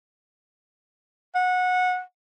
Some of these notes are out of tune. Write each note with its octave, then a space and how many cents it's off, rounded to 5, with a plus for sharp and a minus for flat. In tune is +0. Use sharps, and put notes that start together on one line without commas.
F#5 -20